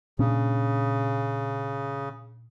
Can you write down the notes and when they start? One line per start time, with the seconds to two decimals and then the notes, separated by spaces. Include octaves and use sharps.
0.19 A#2 C#3 C#4 D4